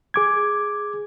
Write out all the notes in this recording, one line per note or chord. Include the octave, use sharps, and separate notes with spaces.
G#4 D6 G#6